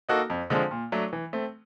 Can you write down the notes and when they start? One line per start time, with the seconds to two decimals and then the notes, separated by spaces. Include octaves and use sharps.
0.09 A#3 D#4 F#4 A4
0.30 F2
0.50 D3 F3 G#3 C4
0.71 A#2
0.92 F#3 A3 D4
1.13 E3
1.33 A3 C4